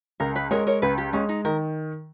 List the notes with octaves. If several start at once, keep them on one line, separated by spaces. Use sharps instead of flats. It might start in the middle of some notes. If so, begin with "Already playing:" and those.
C#2 A#4
B4
G#3 A#4 C#5
A#4 C#5
C#2 B4
G4
G#3 C#4
D#4
D#3 A#4